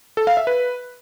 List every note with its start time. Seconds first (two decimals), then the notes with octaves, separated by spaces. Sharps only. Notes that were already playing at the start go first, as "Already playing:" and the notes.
0.17 A4
0.27 F5
0.37 E5
0.47 B4